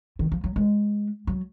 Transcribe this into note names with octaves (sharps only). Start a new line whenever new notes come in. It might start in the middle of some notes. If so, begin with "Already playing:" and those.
D#3
F3
F#3
G#3
F#3